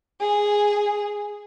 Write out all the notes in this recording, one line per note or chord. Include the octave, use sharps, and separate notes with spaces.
G#4